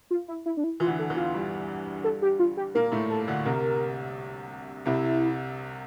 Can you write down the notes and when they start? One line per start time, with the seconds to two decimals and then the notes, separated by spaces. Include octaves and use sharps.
0.11 F4
0.28 E4
0.46 E4
0.57 D4
0.64 E4
0.80 E3 F4
0.87 D2 D3
0.99 A4
1.10 E2 E3
1.16 F4
1.34 G2 G3
2.04 A4
2.22 G4
2.39 F4
2.57 G4
2.75 A#2 A#3 A#4
2.92 A2 A3
3.10 A4
3.28 D2 D3
3.45 C2 C3 A#4
4.86 C2 C3 E4